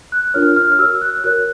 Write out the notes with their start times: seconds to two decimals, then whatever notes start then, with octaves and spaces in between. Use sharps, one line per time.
0.12 F#6
0.34 D4 F4 A#4 C#5 F6
0.56 F6
0.72 F6
0.79 F#4 A#4 C#5 E6
1.01 F#6
1.24 F#4 A#4 C#5 F#6